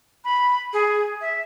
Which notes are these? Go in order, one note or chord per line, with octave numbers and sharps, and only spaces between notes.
B5
G#4
E5